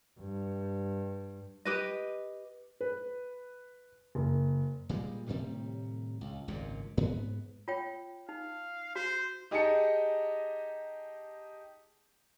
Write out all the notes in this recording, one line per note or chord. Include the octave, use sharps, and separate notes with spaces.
G2
G4 B4 D#5
B4
F#1
A#2 G3 G#3
A2 C3 D#3 G3
C#2
G#1 C#2 F#2 A#2
G#2 B3
F4 C#5 G5
D#4 F5
F#4 C5
D#4 G4 G#4 D#5 A5 C#7